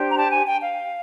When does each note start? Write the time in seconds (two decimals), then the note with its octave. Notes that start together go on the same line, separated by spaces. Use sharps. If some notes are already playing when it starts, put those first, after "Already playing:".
Already playing: D4 G4 C5
0.11 A#5
0.17 A5
0.32 G#5
0.46 G5
0.61 F5